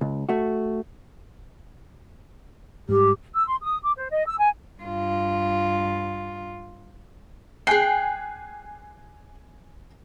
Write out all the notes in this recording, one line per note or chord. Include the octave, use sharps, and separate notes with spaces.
C#2
A3 F#4
G#2 G3 G4
E6
C6
D#6
D6
C5
D#5
E6
G#5
G2 F4
G#4 G5 G#5 F#6 C7